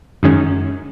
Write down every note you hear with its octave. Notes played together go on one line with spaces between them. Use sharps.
F#2 D#3 G#3 C#4